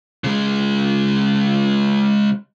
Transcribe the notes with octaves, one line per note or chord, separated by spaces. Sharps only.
C#3 G#3